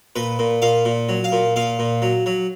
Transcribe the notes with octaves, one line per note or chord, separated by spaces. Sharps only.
A#2 B4
A#2
A#2 F5
A#2
F#3
F5
A#2
A#2 F5
A#2
F#3
F#3